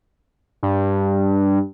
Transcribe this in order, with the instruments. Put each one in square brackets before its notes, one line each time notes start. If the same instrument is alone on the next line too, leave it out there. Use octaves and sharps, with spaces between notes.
[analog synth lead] G2